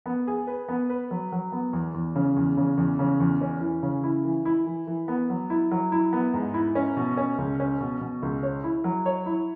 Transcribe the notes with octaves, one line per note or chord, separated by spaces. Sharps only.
B3
G#4
B4
B3
B4
F#3
F#3
B3
E2
E2
C#3
E2
C#3
E2
C#3
E2
C#4
E3
C#3
E4
E3
E4
E3
E3
B3
F#3
E4
F#3
E4
B3
G#2
E4
C#4
B2
C#4
C#2
C#4
B2
B2
C#2
C#5
E4
F#3
C#5
E4